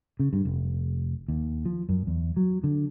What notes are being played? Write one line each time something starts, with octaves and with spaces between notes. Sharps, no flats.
C#3
G2
F1
D#2
F3
F#2
E2
F#3
D3